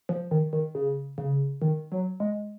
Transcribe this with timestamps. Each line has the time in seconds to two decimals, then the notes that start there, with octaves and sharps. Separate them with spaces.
0.09 F3
0.31 D#3
0.53 D#3
0.75 C#3
1.18 C#3
1.62 D#3
1.92 F#3
2.20 G#3